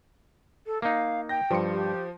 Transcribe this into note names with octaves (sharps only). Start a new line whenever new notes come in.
A4
A#3 D#4 F5
G5 G6 A#6
G2 F3 C6 C#7
G4